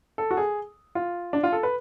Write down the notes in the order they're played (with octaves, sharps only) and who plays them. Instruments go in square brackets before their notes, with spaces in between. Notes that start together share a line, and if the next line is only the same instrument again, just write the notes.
[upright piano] A4
F#4
G#4
F4
D4
F4
A4
B4